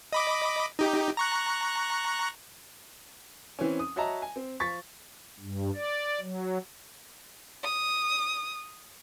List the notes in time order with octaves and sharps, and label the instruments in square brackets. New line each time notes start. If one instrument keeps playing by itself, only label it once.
[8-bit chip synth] D#5 B5 D6
D#4 G4
A#5 C#6 F#6
[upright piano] E3 C4 C#4
D#6
F#4 C#5 D#5 E5 A5 A#5
G#5
C4
F3 C#6 A6 B6
[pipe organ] G2
D5
F#3
[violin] D#6